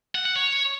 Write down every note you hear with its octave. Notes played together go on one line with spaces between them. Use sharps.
F#5
F#5
C#5